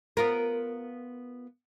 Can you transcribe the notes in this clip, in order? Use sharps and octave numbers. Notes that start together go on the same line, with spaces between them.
B3 F4 A#4